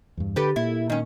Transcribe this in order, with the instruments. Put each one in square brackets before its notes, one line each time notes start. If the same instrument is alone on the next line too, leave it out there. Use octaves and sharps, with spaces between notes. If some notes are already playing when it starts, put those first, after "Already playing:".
[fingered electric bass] E2 G2
[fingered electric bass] D3 [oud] G4 A4 B4
[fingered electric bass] A#2 A#3 [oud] E4
[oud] D#3 C#4